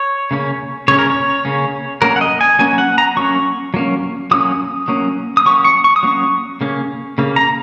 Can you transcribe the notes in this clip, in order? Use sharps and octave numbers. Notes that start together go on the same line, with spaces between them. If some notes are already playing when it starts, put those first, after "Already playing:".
Already playing: C#5
C#3 A#3 C#4
C#3 A#3 C#4 C#5
A#4
C#5
C#3 A#3 C#4
F#3 A#3 C#4 A#4
F#5
D#5
G#5
F#3 A#3 C#4 G#5
F#5
A#5
F#3 A#3 C#4 C#6
F#3 A#3 C#4
F#3 A#3 C#4 D#6
F#3 A#3 C#4
D#6
F#3 A#3 C#4 C#6
C#6
C#6
D#6
F#3 A#3 C#4 C#6
C#3 A#3 C#4
C#3 A#3
A#5